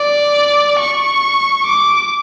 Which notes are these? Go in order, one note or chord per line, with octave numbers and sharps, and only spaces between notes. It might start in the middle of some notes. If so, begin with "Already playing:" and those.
Already playing: D5
C#6
D6